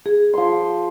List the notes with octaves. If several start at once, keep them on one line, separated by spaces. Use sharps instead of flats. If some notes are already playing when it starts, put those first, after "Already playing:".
G#4
F3 C6